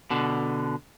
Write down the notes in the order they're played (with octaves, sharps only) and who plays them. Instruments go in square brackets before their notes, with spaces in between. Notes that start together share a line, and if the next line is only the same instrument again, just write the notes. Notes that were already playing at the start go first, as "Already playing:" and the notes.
[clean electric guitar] B2 D3